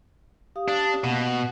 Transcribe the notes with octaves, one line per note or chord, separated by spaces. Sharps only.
G4 F5 D#6
D4
B2 A#3 F#5